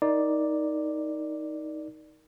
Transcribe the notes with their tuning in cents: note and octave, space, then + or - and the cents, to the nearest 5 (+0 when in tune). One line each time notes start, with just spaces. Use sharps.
D#4 +10 A#4 +0 D5 +0